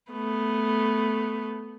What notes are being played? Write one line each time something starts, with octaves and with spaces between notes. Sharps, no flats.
A3 B3